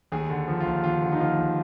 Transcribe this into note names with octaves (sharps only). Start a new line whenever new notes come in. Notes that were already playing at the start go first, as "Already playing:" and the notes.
D#2 G#4
D3
F3
F4
D#2
D#2 F4
D3
D#4
F3 F4
D#2